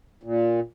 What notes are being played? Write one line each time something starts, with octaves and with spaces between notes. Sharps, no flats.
A#2